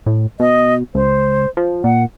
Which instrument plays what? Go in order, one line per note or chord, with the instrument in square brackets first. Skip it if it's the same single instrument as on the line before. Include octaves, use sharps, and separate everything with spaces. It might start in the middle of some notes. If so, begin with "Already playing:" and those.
[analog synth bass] A2
[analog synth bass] B2 [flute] D#5
[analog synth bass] C#2 [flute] C5
[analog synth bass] F3
[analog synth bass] A#2 [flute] F#5